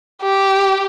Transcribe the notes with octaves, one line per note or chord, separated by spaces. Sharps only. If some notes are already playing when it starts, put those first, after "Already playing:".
G4